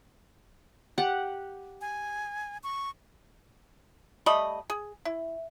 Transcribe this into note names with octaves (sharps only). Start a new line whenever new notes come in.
G4 F#5
G#5
C#6
G3 A3 D#5 B5
G#4
E4